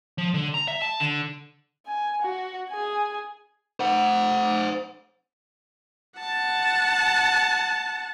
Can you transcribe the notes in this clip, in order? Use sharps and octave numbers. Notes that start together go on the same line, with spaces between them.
F3
D3
A#5
E5
A5
D3
G#5
F#4
G#4 G#5
C5 F#5
F#5 A5